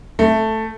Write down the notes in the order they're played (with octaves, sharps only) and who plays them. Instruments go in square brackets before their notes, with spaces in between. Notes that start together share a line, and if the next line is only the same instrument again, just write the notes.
[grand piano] A3